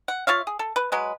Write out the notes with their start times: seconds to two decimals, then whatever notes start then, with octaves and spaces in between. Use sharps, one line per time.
0.08 F#5
0.27 F4 C#5 E5 F5
0.47 G#4
0.59 A4
0.76 B4
0.92 F#3 G#3 B4